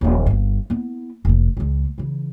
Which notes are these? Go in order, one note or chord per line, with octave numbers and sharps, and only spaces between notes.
D#1 F3
G1 G2
B3 E4
F1 C3
C#2 G#3
C#3 E3